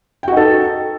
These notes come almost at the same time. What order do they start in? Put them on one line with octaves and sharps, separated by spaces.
G5 F#4 D#4 A4